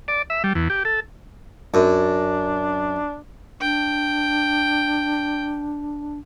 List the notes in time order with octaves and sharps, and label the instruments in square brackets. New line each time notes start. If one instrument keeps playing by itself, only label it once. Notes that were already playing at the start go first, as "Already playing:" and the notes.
[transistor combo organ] D5
E5
G3
E2
G4
A4
[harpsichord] F#2 [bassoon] D4
[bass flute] D4 [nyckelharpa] G5